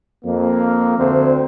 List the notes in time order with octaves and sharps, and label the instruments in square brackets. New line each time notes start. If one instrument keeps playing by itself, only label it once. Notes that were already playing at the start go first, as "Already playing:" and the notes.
[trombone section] F2 A#3
D2 C4